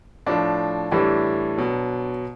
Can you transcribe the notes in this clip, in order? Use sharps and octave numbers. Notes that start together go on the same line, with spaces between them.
A2 F3 D4
A2 E3 G3 D4
B2 F#3